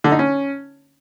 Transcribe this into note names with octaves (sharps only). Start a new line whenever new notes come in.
D3
D#4
C#4